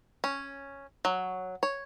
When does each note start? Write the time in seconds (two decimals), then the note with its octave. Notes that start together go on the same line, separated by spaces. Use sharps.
0.24 C#4
1.05 F#3
1.63 C#5